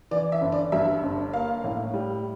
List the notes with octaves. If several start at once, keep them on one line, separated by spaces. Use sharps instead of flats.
E3 D5
E5
G1
D5
G2 E5
G1
A#3 F5
A2
G3